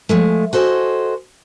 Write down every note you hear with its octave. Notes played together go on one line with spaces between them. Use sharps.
F3 G#3 A3
F#4 A4 C5 C#5 D#5 G#5